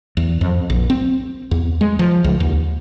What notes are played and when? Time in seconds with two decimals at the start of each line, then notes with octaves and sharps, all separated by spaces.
0.17 E2
0.41 F2
0.70 A#1
0.90 C4
1.51 E2
1.81 G#3
1.99 F3
2.24 C#2
2.40 D#2